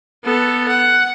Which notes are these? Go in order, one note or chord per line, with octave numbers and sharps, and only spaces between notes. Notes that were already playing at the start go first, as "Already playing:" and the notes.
B3 A4
F#5